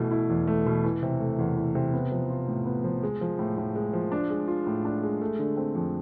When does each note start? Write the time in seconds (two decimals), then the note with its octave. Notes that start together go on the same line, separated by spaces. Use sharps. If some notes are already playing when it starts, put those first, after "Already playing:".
Already playing: B2 E3 A3
0.11 E4
0.30 E2
0.47 A3
0.66 B2
0.84 E3
1.03 C3
1.20 A3
1.39 E2
1.57 E3
1.75 C3
1.94 B3
2.12 F3
2.30 F4
2.48 A2
2.66 B3
2.84 F3
3.03 G#3
3.21 F3
3.39 A2
3.58 A2
3.75 G#3
3.93 F3
4.12 D4
4.30 G#3
4.48 F4
4.67 A2
4.85 D4
5.03 G#3
5.21 A3
5.39 D3
5.57 C4
5.75 F2